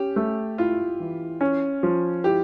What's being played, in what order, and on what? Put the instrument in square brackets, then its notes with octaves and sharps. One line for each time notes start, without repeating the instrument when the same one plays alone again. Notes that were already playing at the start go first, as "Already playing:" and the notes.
Already playing: [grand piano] C#4 [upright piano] G4
[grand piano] A3
[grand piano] E4 [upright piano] F4
[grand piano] E3
C#4
F3
[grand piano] E4 [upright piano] G4